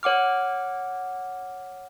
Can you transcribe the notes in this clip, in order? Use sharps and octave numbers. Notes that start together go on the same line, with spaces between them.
C#5 F#5 D6 F6